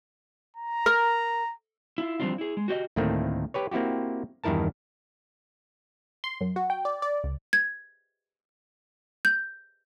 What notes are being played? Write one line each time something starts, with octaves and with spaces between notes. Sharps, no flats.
A#5
A#4
E4 F4
E3 F3 G3 C4 D4 F4
E4 G#4
G#3
F#4 G4 C#5 D#5
D2 A2 D#3 A3 A#3 C4
G4 B4 C#5
A#3 C4 E4 F#4 G4
E2 G2 D#3 E4 A#4 A5
C6
F#2
F#4
G5
D5
D5
C#2
G#6
G6